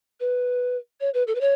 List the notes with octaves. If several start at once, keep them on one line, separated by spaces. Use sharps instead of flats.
B4
C#5
B4
A4
B4
C#5